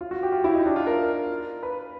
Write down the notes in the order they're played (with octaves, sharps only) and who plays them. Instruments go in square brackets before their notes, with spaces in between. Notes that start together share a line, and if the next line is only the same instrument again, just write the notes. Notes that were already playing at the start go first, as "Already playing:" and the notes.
[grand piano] F4
F#4
G4
F4
E4
D#4
D4
F4
A#4
B4